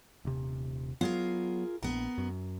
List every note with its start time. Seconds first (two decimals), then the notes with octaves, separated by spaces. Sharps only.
0.25 D#1 C3
1.01 F#3 B3 F4 G#4 A#4
1.83 A#1 B3 A#4
2.18 F#2